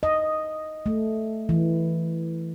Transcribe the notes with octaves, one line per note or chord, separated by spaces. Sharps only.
D#5
A3
E3